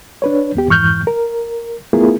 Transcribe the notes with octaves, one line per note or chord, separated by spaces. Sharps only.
D4 B4 C#5
D#2 B3 G4
F2 G#2 E3 C#6 F6 G6
A#4
A3 B3 E4 F4 G#4 A#4